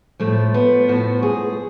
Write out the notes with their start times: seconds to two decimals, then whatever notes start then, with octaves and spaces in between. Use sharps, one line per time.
0.20 A2 F3 A3
0.54 B3
0.88 A2 F3 F#4
1.23 G#4